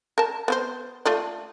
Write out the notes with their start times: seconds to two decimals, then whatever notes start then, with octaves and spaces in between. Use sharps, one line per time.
0.18 A#4 A5
0.48 B3 C4 C5
1.05 A3 F4 D5